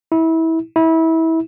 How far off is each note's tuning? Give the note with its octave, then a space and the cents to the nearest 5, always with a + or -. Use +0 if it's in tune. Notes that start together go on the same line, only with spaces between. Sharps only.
E4 -25
E4 -25